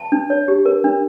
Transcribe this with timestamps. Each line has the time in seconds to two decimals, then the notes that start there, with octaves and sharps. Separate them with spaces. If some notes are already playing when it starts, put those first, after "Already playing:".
Already playing: A5
0.12 D4
0.30 C#5
0.48 G4
0.66 A#4
0.84 D4